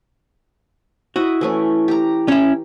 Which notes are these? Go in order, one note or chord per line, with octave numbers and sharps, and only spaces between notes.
E4 F#4 D#5
E3 A3 C#4
G4 A#5
C#4 E4